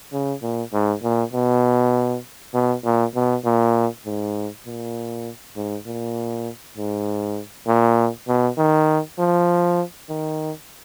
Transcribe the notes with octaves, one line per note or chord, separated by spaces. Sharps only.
C#3
A#2
G#2
A#2
B2
B2
A#2
B2
A#2
G#2
A#2
G#2
A#2
G#2
A#2
B2
D#3
F3
D#3